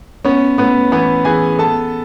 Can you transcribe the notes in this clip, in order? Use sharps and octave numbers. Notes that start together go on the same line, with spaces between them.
B3 C#4 C#5
A2 B3 B4
E3 B3 B4
E3 G#4 G#5
B3 A4 A5